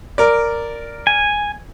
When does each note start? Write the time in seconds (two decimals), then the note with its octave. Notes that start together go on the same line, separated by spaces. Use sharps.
0.18 A#4 D5
1.07 G#5